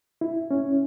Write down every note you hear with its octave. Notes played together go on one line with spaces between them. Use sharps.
E4
C#4